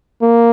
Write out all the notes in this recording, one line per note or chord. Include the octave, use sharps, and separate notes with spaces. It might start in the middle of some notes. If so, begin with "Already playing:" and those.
A#3